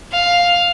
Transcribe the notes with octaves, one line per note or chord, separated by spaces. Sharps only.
F5